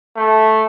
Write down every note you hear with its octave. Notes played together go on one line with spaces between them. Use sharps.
A3